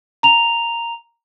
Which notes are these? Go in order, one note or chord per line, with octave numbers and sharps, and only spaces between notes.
A#5 F7